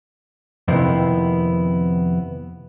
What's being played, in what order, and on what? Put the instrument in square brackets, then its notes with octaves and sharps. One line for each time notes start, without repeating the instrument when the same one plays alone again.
[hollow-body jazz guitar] F2 C3 D#3 A#3 B3 E4